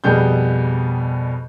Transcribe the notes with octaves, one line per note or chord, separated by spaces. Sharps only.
F2 B2 G3 B3 G#4 G6